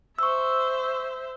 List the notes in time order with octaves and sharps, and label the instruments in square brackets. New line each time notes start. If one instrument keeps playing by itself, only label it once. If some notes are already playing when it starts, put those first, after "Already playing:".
[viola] C5 E5 [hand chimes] C#6 E6